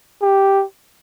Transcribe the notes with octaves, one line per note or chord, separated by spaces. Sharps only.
G4